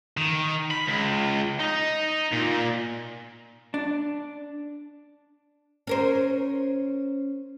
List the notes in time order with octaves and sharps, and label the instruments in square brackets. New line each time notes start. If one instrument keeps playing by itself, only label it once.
[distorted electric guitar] D#3
B5
C#2
D#4
A#2
[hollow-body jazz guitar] D4
[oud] C#4 A#4 C5